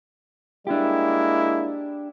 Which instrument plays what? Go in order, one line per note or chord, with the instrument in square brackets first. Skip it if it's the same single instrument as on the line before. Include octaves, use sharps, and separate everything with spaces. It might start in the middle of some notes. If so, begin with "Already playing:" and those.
[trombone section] G#3 A#3 E4 [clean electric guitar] D4 G4